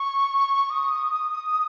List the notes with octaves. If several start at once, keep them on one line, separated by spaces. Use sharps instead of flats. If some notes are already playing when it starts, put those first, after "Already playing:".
Already playing: C#6
D#6